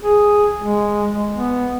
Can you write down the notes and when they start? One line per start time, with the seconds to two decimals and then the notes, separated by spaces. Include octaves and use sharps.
0.01 G#4
0.61 G#3
1.33 B3